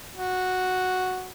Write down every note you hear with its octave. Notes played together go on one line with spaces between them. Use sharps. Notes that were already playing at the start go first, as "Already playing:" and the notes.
F#4